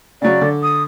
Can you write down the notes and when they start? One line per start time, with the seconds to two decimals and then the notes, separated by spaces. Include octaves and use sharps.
0.22 C#3 F#3 D5
0.41 D3
0.63 D#6